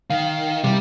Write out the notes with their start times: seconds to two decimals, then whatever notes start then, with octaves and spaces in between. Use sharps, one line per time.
0.10 D#3 F5
0.64 C3 G3